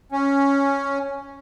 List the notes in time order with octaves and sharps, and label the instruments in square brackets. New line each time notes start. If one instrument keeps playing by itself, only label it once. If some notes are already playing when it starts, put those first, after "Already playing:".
[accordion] C#4